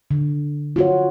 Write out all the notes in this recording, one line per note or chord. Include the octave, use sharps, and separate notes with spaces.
D3
F4 F#4 C#5